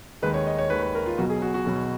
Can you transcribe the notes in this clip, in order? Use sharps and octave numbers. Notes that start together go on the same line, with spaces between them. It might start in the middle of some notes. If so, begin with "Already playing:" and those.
D#2 D#3 G#3 B4
C#5
D#5
C#5
D#2 D#3 G#3 B4
B4
A#4
F4
B1 B2 F#3 F#4
G#4
F#4
F#4
B1 B2 F#3